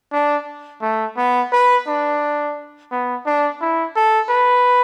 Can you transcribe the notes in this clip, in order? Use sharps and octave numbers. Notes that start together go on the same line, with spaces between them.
D4
A3
B3
B4
D4
B3
D4
E4
A4
B4